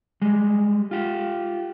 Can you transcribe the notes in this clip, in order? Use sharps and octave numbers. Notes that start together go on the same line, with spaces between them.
G3 G#3
F4 G4